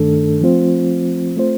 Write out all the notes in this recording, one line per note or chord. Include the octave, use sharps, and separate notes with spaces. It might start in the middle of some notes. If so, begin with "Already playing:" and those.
Already playing: G2 D#3 A3 D4 A4
F3 A3 C4 F4 C5
A3 C4 F4 C5